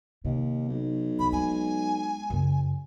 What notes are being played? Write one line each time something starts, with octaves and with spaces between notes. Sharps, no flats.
D#2 C3
B1
C2 B5
G#3 G#5
F#2 C#3